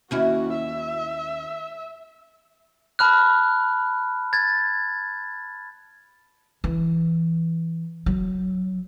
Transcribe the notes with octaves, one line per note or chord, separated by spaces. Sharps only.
D#2 C#4 E4 F#4
E5
A5 B5 F6 F#6
G#6 A6
E3
F#3